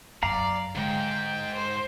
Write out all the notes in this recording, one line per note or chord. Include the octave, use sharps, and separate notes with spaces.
F#2 D5 F5 A#5
G#2 D3 G#3 G5
C5